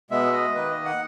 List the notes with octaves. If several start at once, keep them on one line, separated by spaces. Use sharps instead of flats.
B2 G#3 B3 E5
D#5
D#3 A#3 B4
D#5
F#5